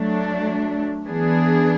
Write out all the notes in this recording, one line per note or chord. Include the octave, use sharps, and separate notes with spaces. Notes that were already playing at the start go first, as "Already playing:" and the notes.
Already playing: F#3 A3 D4
E3 B3 D4 G#4